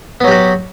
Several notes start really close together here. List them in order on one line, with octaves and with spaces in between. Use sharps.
B3 F#3 G4 F#4